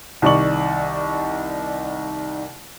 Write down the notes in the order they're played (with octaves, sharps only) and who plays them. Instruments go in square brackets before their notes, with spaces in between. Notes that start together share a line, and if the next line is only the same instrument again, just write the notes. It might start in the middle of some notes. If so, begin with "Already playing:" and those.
[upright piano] C2 D#3 D5 C#6 F#7